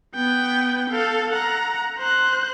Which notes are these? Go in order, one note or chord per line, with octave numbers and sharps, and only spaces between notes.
B3 G5
A4 F5
F#5 A#5
C5 F#6